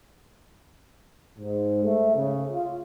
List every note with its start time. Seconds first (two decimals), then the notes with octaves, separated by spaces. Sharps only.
1.39 G#2
1.84 A3
2.15 C#3
2.52 F4